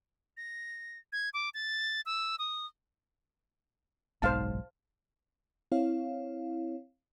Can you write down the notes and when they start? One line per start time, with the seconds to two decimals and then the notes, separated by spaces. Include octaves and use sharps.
0.37 A#6
1.12 G#6
1.34 D6
1.54 A6
2.06 E6
2.39 D#6
4.22 F#1 B1 G#2 C5 F5 A5
5.72 C4 E4 C#5 F5